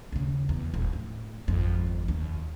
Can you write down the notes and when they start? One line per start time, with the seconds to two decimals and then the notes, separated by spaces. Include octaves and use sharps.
0.12 D#2 C#3
0.49 E2
0.74 D#1
0.93 A2
1.48 G#1 F2
2.08 D#2